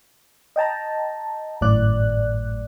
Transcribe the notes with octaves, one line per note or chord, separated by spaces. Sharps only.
D#5 G5 A5 A#5
G#1 F#2 A2 D5 F#6